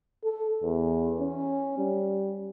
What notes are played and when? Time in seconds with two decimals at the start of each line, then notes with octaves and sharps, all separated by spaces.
0.24 A4
0.63 E2
1.20 C#4
1.78 G3